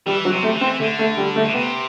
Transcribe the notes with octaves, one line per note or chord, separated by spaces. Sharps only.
E3 G3
F#3
C3
A3
E3
C4
D3 A3
A3
G3
A3
B2
C3 B3